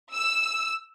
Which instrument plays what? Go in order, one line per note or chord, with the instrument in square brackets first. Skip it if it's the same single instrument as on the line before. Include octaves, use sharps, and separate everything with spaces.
[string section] E6